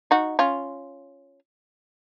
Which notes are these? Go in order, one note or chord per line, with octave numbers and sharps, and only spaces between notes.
D#4 F#4
C#4 F4